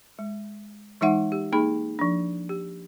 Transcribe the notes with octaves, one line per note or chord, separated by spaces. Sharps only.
G#3
E3 G#3 D#4 E5 F#5
G4
A#3 D#4 G#4 B5
F3 D4
G4